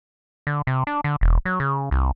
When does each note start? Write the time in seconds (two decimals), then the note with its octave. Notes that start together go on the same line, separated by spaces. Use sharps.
0.47 D3
0.67 C3
0.87 D4
1.04 D3
1.21 E1
1.45 F#3
1.60 C#3
1.91 C2